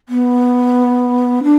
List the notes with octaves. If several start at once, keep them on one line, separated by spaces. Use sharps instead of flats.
B3
D4